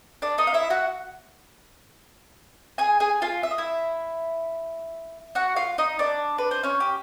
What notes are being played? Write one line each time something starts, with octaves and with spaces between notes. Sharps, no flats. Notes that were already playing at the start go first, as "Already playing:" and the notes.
D4 D5
D#4 D#5
F5
E4 E5
F#4 F#5
G#4 G#5
G#4 G#5
F4 F5
E5
D#5
E4 E5
F#4 F#5
F4 F5
D#4 D#5
D4 D5
B4
C5
C#4 C#5
G4